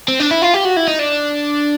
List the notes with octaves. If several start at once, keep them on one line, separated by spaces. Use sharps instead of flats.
C4
D4
E4
F4
G4
F#4
E4
D#4
D4